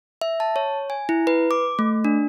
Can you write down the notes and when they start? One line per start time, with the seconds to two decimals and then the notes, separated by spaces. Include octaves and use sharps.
0.21 E5
0.40 A5
0.56 C#5
0.90 G#5
1.09 E4
1.27 B4
1.51 D6
1.79 A3
2.05 D4